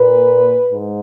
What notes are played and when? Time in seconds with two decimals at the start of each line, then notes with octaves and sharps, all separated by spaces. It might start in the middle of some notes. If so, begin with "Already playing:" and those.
Already playing: A#2 B4
0.72 G#2